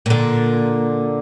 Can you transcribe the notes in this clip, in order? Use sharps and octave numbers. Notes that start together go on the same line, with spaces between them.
A#2 D3